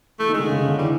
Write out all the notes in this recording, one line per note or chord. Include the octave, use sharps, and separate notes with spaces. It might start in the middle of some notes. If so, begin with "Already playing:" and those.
E3 A3
D#3
G#3
D3
C#3
C#3
D3
E3 G3